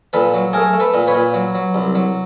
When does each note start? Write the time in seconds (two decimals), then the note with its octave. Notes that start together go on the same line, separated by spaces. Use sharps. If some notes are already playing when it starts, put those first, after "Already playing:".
0.13 A#2 A4 B4
0.34 F#3
0.53 A3 G#4 A#4
0.73 A3
0.80 A4 B4
0.94 A#2
1.07 B4 C#5
1.14 A#2
1.34 F#3
1.55 F#3
1.74 C2
1.95 F#3